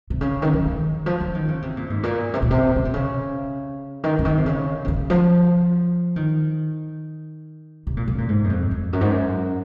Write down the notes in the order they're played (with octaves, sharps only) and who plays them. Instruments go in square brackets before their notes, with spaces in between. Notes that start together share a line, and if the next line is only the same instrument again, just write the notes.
[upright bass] C3
C#3
D#3
F3
D#3
F3
F3
D#3
C#3
C3
A#2
G#2
A#2
C3
A#2
C3
C#3
C3
C#3
D#3
C#3
D#3
C3
C#3
C3
C#3
F3
D#3
C3
A#2
C#3
A#2
G#2
F#2
F2
F2
F#2
G#2
F#2